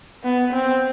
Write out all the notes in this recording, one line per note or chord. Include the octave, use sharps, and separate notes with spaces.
B3
C4